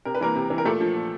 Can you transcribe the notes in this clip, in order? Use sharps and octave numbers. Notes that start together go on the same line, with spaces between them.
C3 A#4
B4
E3 A#3 A#4
C3
E3
A#4
A#2 A3 A4
F3
A#2